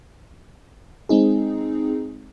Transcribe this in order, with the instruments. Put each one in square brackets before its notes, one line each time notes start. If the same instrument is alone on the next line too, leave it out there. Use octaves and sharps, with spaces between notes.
[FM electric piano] G#3 C4 D#4 G#4